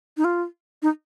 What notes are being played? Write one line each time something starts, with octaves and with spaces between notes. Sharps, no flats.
D#4
F4
D#4